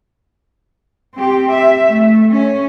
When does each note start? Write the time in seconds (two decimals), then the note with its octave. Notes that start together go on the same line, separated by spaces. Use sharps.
1.15 C4 G4
1.51 E5
1.89 A3
2.32 C#4